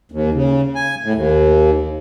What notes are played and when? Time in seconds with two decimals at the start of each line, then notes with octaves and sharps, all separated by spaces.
0.12 D#2
0.34 C#3
0.75 G#5
1.03 A2
1.15 D#2